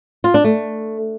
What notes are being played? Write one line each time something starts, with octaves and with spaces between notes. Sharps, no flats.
F4
D4
A3